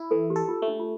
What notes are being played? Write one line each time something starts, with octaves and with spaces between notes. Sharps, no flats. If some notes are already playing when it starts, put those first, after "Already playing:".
Already playing: E4
E3 A4
G4
A4
F4
A3
D4
F4